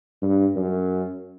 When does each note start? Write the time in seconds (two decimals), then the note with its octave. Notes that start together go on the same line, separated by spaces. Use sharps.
0.22 G2
0.56 F#2